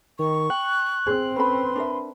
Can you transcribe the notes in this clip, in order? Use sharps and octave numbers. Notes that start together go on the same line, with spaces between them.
D#3 C#6
G5 F#6
C4 G#4
C#4 A4 B4 B5 C6
D4 A#4 E5